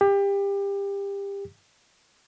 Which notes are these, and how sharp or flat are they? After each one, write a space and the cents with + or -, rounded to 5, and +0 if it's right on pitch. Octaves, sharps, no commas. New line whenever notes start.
G4 +25